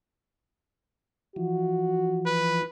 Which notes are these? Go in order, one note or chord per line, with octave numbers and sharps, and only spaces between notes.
E3 F3 F#4
B4